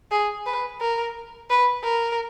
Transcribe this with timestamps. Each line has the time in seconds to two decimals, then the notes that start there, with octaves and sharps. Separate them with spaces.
0.11 G#4
0.46 B4
0.80 A#4
1.50 B4
1.84 A#4